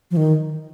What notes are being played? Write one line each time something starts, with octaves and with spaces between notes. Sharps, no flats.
F3
D#3